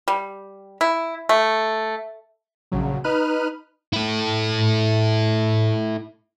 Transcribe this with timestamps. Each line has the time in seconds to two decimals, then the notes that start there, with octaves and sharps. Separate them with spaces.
0.08 G3
0.81 E4
1.29 A3
2.72 A#1 C#3 F#3
3.04 D#4 B4 F6 F#6 D#7
3.93 E4 A4